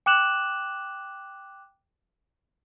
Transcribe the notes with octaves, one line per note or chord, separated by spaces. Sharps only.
G5 D6 F#6 E7 F#7